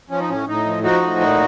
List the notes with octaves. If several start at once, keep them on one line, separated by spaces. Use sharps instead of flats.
F3 C#4
D#4
A2 C#4
A2 D#4
F3
F3 D#4 F#4
A2
A#2